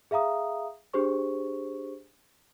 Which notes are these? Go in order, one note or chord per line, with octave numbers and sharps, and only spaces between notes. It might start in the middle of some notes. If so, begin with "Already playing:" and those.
G#4 E5 F5 A#5 D#6
D4 G4 G#4 C5 C#6